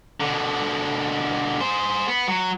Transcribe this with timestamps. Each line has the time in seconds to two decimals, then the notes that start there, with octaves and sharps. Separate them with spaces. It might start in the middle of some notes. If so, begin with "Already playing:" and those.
0.20 B2 D3
1.61 G#4 C5
2.08 B3
2.28 F#3